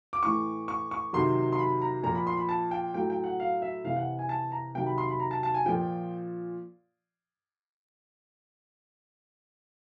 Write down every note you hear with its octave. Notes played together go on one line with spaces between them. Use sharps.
D6
A2 E3 C#6
C#6
C#6
C3 D#3 F#3 C6
C6
B5
A#5
A#2 F3 A#5
B5
C6
B5
A5
G5
A2 F#3 G5
G5
F#5
F5
E5
C3 E3 F5
F#5
G#5
A5
A#5
C3 D#3 F#3 G5
B5
C6
B5
A#5
A5
A5
G#5
A#2 F3 G5